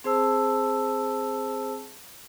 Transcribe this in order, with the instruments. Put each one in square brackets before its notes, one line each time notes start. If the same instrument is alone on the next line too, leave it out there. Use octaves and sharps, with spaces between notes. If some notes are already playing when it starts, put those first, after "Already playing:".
[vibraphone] C4 G#4 C5 A5 E6